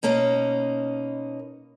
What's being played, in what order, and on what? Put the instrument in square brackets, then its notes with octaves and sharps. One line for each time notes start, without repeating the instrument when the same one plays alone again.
[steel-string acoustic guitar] B2 A#3 C#4 D#4